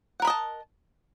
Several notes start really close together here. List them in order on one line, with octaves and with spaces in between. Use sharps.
F#5 A#4 B5 D#5 A5